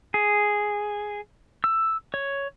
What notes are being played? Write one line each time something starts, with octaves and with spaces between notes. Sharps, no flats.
G#4
E6
C#5